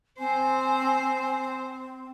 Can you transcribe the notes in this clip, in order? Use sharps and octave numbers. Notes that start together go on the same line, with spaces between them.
C4 C5 G#5